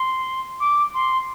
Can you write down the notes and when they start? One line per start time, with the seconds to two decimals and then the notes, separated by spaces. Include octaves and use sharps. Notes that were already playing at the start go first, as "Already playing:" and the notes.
Already playing: C6
0.60 D6
0.94 C6